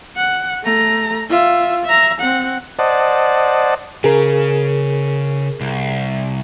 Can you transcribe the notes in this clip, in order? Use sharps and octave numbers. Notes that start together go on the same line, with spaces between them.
F#5
A3 A#5
F4 E5
E5 A#5
C4 F#5
C5 D5 D#5 F#5 A5
C#3 G#4 A#4
C2